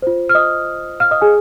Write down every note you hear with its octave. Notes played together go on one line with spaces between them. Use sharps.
F4 C5
F6
D#5 D#6
F5 F6
D#5 D#6
G#4 G#5